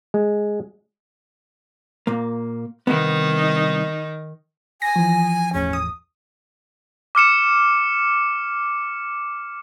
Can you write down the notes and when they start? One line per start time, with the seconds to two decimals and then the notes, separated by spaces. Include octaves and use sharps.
0.14 G#3
2.07 A#2 A#3
2.87 C2 G2 D#3 B3 D#4
4.82 G#5 A#6
4.96 E3 F3
5.53 G1 E2 A2 C#4
5.73 D#6
7.15 D6 F6 C#7 E7